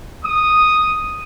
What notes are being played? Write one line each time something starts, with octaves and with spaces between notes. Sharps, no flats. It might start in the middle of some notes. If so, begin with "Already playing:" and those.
D#6